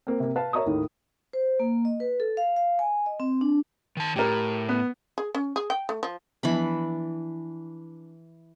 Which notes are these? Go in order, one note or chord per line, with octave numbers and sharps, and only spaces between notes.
A#3 C4
C3 A#3
B4 F5 A5
A#4 C#5 E5 A#5 C#6 D#6
D#2 A2 D#3
C5
A#3
D#5
B4
A4
F5
F5
G#5
D#5
C4
D4
D#3 A5
A2 G4 A#4
B3
G#4
C#4
G#4
G5
A3
F3
E3 F3 B3 D4 E5 B5